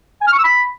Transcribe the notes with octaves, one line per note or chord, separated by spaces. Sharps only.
G#5
F6
C#6
E6
B5